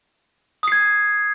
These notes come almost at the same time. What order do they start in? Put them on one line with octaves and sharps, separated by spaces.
D#6 C7 G#6